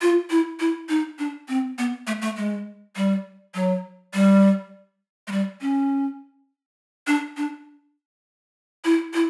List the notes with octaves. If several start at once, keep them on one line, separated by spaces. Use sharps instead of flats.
F4
E4
E4
D#4
D4
C4
B3
A3
A3
G#3
G3
F#3
G3
G#3
G3
C#4
D4
D4
E4
E4